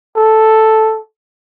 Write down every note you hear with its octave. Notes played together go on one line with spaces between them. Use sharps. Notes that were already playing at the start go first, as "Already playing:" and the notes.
A4